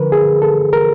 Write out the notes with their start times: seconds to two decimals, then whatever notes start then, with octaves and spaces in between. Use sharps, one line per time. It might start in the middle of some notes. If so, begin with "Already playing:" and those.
Already playing: D3 F3 A#4 B4
0.12 G#4
0.42 A4
0.73 A#4